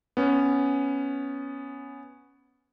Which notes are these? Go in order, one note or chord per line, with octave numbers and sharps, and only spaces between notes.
B3 C#4